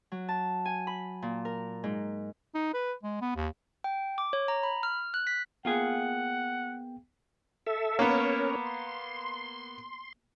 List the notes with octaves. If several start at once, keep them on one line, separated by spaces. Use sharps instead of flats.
F#3
A5
G#5
B5
A#2
A#4
G#2
D#4
B4
G#3
B3
D#2
G5
D6
C#5
A#5
B5
F6
F#6
B6
A#3 B3 F4 G#4 F#5 G5
A4 E5
A#3 B3 C#4 A#4 C#5
C6